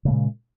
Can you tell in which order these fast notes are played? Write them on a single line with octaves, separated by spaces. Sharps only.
C#3 A3 A#2 G#3